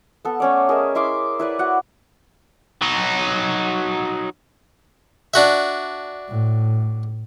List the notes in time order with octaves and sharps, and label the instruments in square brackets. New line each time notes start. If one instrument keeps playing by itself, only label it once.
[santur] B3 A4
A3 C#4 D5
G#4 A#4 D#5 E5
E4 E5 C6 D6
E4 B4 D5
F#4 F#5
[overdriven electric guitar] F#3 D#4
[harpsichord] D4 F#4 E5
[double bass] A2